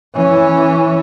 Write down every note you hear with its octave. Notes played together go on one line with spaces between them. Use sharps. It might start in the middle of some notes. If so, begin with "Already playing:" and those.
E3 C#4